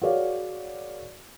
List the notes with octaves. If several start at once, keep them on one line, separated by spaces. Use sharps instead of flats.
F#4 G#4 A#4 C#5 D5 F5